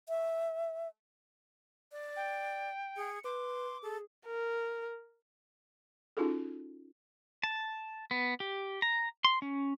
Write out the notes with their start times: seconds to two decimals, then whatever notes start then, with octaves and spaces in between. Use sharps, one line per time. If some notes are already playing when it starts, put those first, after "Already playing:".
0.09 E5
1.92 D5
2.16 G5
2.96 G#4 C#7
3.24 B4 C6 D6
3.83 G#4 A4
4.26 A#4
6.17 C#4 D#4 F4 F#4 G#4 A4
7.43 A5
8.11 B3
8.40 G4
8.82 A#5
9.24 C6
9.42 C#4